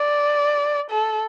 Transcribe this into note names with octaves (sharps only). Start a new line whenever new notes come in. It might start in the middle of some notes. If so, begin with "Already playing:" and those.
Already playing: D5
A4